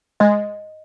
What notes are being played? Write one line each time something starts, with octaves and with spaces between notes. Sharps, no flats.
G#3 D#5